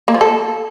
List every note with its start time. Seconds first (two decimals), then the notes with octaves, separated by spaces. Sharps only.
0.08 A#3
0.14 F3
0.21 A4